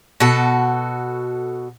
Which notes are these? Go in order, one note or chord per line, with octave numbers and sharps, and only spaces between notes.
B2 F#4 A4